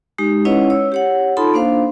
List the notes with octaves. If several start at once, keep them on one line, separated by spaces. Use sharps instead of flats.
G#3 D#4 G4
C#4 E4 B4 C#5 D#5 F#5
C#5 E6
G4 C#5 F#5
D#4 F4 A4 A5 B5 C6
A#3 D4 C5 F5